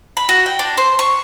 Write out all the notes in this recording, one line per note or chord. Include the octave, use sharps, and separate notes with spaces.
B5
F#4
G5
D4
C5
C#6